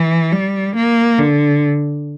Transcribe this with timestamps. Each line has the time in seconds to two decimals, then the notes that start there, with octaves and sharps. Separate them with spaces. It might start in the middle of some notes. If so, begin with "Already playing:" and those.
Already playing: E3
0.32 G3
0.76 A#3
1.18 D3